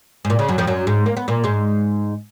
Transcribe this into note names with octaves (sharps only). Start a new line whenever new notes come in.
G#2
A#2
C#3
F#2 F#3
F2 F3
F#2 F#3
G#2 G#3
A#3
B3
A#2 A#3
G#2 G#3